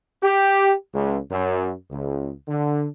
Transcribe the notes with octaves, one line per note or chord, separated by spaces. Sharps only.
G4
C#2
F#2
C#2
D3